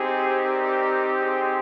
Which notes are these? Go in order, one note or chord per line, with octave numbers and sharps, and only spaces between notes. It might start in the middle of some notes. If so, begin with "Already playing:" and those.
Already playing: C4 D#4 G4 G#4 C5
A#4 D5
G#4 C5